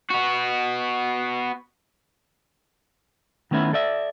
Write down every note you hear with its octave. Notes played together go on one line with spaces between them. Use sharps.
B3 F#4
D#3 A3 B3 C#4 E4
A4 D5 E5